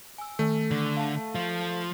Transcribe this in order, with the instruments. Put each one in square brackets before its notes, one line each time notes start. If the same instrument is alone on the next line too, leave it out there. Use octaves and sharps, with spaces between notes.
[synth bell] G#5 E6
[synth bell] D#3 [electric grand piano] A3
[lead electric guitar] D3
[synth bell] F5 A5
[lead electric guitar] F3